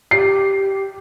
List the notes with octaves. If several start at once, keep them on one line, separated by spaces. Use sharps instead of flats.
G4 C7